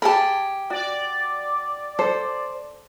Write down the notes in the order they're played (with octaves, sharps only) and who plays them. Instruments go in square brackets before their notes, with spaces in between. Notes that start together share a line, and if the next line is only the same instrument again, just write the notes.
[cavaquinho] G4 G#4 A#4 [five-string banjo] A5 B5
[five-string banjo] F#4 [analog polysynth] D5
[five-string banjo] A4 [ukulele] C5